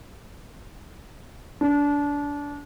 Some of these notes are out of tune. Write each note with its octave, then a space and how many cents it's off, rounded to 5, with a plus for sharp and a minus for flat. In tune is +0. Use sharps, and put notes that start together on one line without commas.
D4 -25